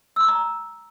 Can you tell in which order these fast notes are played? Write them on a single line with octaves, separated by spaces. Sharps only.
E6 C6 D6 A#5